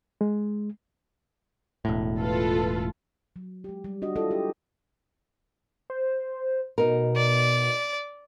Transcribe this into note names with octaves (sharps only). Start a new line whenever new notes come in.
G#3
E1 A2
F4 A4 B4
F#3
G#3 G4
G3
D4 F#4 D#5
E4 F4 A4 D#5
G4
C5
B2 D#4 A#4
D5